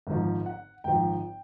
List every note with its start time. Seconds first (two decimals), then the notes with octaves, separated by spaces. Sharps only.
0.07 G#1 G#2 F3
0.46 F#5
0.84 G#1 G#2 F3 G5